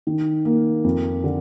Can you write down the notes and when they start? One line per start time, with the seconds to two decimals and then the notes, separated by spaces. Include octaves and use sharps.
0.07 D#3
0.45 A#3
0.84 F2
1.24 D3